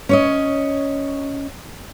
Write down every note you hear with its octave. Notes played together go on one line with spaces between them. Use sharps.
C#4 C#5 D#5